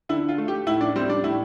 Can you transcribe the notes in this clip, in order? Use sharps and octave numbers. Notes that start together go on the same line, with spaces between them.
D3 E4
F4
A3
G4
A2 E4
D4
G3 C4
D4
A2 E4